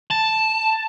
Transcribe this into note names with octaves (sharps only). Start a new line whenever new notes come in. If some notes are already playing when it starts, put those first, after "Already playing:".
A5